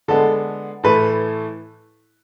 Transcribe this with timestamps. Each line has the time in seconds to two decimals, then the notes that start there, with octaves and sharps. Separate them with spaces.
0.08 D3 G#3 B3 A4
0.84 A2 E3 A3 B4